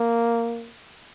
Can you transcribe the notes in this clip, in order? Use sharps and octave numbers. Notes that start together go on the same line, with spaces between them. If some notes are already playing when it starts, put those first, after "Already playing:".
Already playing: A#3